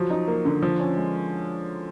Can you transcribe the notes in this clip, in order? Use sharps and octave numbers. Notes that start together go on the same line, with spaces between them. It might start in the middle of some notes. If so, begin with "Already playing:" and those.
Already playing: F3 F#3
D#4
A#3
D3
F3
C#4
G#3